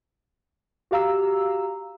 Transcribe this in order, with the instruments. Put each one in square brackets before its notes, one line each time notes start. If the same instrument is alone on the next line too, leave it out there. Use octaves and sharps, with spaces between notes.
[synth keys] F#4 G4 F5 A#5 E6